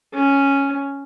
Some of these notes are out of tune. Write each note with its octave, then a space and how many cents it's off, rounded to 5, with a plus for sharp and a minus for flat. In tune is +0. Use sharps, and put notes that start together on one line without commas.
C#4 +0